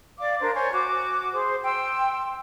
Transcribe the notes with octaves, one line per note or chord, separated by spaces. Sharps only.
D5 F5 D6
D4 A#4 C5
C5 C#5 G#5
F#4 D6
G#4 C5
G5 C6 E6